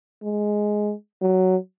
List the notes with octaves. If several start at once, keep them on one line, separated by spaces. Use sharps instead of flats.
G#3
F#3